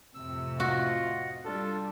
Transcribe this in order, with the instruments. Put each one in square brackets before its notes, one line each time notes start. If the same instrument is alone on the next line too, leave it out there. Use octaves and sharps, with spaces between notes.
[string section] F2 A2 C3 [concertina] E6
[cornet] F4 [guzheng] F#4 [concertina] D#5 F#5
[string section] G3 [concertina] D4 F4 [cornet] A4